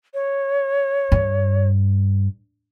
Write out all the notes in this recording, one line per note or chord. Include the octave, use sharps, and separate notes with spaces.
C#5
G2